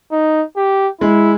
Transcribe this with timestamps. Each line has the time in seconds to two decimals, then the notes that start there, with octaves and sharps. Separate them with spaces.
0.12 D#4
0.57 G4
1.01 G#3 E4